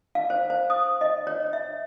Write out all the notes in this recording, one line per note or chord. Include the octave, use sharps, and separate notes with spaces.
F5
C5
C5
D#6
D#5
C#5
E5